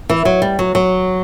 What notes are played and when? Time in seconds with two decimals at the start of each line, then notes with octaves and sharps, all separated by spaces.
0.09 E3
0.25 F#3
0.42 G3
0.59 F#3
0.75 F#3